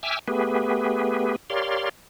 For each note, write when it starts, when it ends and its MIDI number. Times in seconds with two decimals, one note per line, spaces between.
0.03 0.19 76
0.03 0.19 79
0.03 0.19 80
0.03 0.19 86
0.03 0.19 88
0.03 0.19 89
0.28 1.36 57
0.28 1.36 59
0.28 1.36 67
0.28 1.36 68
0.28 1.36 71
1.50 1.89 67
1.50 1.89 70
1.50 1.89 73
1.50 1.89 74
1.50 1.89 77
1.50 1.89 84